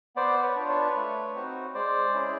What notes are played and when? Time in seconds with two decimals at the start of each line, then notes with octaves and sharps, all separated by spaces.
0.16 B3 C5 D5
0.43 B4 C#5
0.56 D4 F4
0.69 B4 C#5
0.96 A3
1.35 C4 D#4 F#4
1.74 G#3 C5 D5
2.14 C#4 E4 G#4